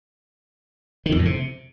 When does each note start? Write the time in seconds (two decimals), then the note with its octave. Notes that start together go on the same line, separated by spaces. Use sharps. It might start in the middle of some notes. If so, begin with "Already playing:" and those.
1.06 D#3
1.12 F2
1.19 A2
1.25 C3